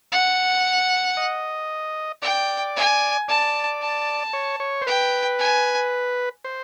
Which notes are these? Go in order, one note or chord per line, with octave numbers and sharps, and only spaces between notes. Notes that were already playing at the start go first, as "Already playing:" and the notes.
F#5
D#5
D5 G5
G#5
D5 A5
A5
C#5
C#5
C5
B4 G5
G#5
C5